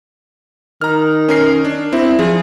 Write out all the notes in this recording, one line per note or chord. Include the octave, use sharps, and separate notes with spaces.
D#3 A#5 F6
C#4 A#4 C7
D4
C4 E4
F3 G#4